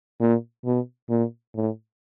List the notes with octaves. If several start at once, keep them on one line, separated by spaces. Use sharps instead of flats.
A#2
B2
A#2
A2